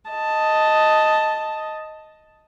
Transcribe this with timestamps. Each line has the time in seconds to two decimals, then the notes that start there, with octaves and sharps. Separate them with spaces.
0.10 D#5 A5